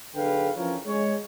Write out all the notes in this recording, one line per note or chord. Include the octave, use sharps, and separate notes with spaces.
B1 D3 G#4 B4 F5 G5
E3 F3 C#4 F4 A#4 C#5
G#3 C#5